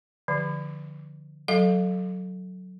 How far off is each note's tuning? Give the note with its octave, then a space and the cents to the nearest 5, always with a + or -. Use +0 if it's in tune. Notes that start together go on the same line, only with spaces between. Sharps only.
D3 +10 F3 -5
F#3 +0 A4 +0 F5 +5